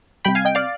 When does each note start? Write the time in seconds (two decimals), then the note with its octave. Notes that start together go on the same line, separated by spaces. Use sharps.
0.25 C3 G3 G5 B5
0.35 F5 G#5
0.45 D#5 G5
0.55 D5 F5